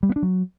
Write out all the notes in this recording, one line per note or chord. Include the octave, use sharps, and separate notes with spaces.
G3
B3
D4
F#3